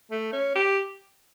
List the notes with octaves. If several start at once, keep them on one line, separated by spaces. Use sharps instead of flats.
A3
C#4
G4